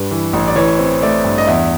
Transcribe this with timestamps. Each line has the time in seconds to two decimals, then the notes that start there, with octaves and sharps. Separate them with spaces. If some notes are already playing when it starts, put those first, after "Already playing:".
Already playing: G2 G3 B4
0.11 E3
0.33 A1
0.48 D5
0.56 E3 C#5
0.79 C4
1.02 A3 D5
1.25 G2
1.38 D#5
1.47 E2 E5